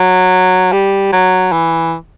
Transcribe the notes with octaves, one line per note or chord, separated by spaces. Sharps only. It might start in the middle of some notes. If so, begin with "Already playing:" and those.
Already playing: F#3
G3
F#3
E3